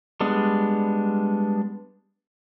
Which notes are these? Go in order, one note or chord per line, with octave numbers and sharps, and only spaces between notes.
G3 G#3 B3 D4